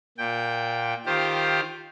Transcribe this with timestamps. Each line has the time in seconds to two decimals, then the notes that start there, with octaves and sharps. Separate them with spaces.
0.18 A#2 G5
1.06 D#3 F4 G4 C5